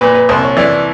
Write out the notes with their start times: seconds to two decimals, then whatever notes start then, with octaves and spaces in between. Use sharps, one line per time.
0.01 A#2 B4
0.15 B4
0.29 C2 C5
0.42 C#5
0.57 E3 D5